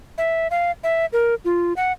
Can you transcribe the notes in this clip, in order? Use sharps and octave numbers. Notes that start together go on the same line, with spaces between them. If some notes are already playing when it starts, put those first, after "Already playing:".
E5
F5
E5
A#4
F4
F#5